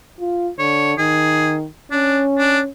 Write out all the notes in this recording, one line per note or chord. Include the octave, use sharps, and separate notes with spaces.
F4
D3 C#5
D#3 G#4
C#4 D4
D4